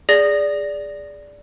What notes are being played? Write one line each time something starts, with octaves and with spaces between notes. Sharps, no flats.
G#4 D5 A#6